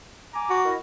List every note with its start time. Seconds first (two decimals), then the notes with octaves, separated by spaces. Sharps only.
0.34 G#5 A#5 D6
0.50 F#4
0.65 E4 A#4 D#5